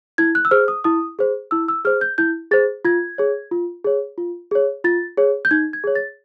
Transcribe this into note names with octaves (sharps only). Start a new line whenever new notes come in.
E4 G#6
F#6
E6
G#4 C5 F6
D#6
E4 D#6
G#4 C5
E4 E6
E6
G#4 C5 F6
G6
E4 G6
G#4 C5 A6
F4 G#6
G#4 C#5
F4
G#4 C#5
F4
G#4 C#5
F4 A6
G#4 C#5
G6
D#4 G#6
G#6
G#4 C#5
A6